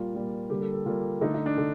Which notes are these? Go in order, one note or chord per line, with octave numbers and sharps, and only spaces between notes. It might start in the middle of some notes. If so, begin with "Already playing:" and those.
Already playing: A#2 G3 A#3 F4
A#2 G3 A#3
D3 G3 A#3 G4
A4
A4
D3 G3 A#3 F4
D3 A3 D#4
D#4
D4
D3